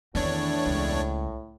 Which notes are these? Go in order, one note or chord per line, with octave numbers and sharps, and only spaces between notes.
E2 A2 D#3 C4 D4 C#5
C#2